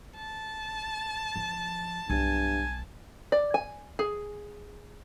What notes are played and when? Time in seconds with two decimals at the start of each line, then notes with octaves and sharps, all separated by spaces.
0.16 A5
1.36 F3
2.10 B1 G2 G#5
3.32 D5
3.54 G#5
3.99 G#4